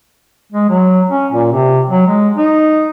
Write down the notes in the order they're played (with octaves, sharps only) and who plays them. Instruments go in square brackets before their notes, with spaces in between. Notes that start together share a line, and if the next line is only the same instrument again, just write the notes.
[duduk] G#3
F#3
C#4
A#2
C3
F#3
G#3
D#4